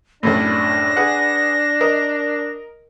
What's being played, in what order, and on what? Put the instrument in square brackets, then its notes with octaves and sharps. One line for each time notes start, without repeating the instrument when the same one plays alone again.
[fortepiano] C2 F#2 A2 [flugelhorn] D4 [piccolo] A#6
[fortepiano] G#4 B4 F#5
A#4 D#5